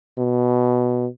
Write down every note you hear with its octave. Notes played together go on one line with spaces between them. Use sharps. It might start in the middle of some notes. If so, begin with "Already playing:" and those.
B2